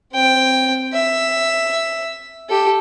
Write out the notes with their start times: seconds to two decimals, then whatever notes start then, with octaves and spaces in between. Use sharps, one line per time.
0.13 C4 G5
0.93 E5
2.49 G4 A4